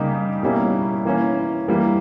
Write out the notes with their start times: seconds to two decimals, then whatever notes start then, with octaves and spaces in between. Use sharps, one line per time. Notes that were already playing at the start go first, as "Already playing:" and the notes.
Already playing: C#3 G3 A#3 D#4 G4
0.43 B2 G3 A#3 C#4 E4
1.05 E3 A#3 C#4
1.68 E3 G3 A#3